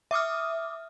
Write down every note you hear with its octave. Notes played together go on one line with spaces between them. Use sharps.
E5 D6 D#6 F6